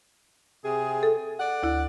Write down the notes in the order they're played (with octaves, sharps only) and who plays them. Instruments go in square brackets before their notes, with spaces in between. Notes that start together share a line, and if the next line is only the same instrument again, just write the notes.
[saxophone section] C3 G#4
[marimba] A4
[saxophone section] D5 F#5
[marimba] D2 E4